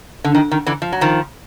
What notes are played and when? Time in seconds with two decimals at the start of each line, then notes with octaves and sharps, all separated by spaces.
0.24 D3
0.35 D#3
0.51 D#3
0.66 D3 E3
0.82 F3
0.92 F#3
1.01 D#3 F3